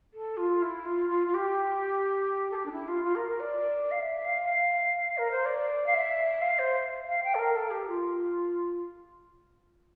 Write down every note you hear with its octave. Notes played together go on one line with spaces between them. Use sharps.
A4
F4
E4
F4
F4
F4
G4
A4
G4
D4
E4
F4
F4
A#4
A#4
D5
F5
E5
F5
A#4
C5
D5
F5
E5
F5
C5
F5
G5
A4
A#4
A4
G4
F4